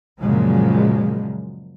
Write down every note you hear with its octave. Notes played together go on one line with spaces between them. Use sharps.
F#2 A#2 C#3 F3 F#3 G#3